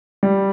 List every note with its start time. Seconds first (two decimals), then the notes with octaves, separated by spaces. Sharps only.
0.23 G3